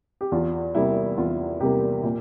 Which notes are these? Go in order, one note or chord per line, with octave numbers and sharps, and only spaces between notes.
G4
E2 F4
C3 G3 A#3 E4
E2 F4
C3 G3 A#3 G4
A#2